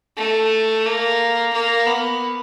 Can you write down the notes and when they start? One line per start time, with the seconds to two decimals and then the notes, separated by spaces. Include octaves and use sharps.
0.17 A3
0.86 A#3
1.53 A#3
1.87 B3